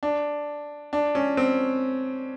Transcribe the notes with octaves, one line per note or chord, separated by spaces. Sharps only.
D4
D4
C#4
C4